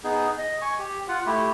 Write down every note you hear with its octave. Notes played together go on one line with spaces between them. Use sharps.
B3 D#4 G#4
D#5
G#5 C#6
G4
F4 F#5
A3 E4 G4